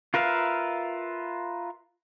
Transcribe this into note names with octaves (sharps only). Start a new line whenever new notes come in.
F4 A#4 B4 E5 F5